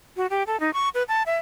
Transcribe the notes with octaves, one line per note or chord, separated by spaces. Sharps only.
F#4
G4
A4
D#4
C#6
B4
A5
E5